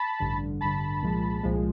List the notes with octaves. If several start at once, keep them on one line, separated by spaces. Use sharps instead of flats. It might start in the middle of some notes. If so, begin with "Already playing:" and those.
Already playing: A5 B5
A1 G2 D3
A1 G2 D3 A5 B5
C2 A#2 F3 G#3
C2 A#2 F3 G#3